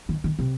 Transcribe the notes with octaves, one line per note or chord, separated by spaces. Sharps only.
D#3
D#3
C3